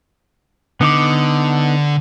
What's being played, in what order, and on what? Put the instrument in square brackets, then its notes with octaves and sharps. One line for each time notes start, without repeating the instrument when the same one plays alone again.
[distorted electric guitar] D3 [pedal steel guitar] B3 D#4 D6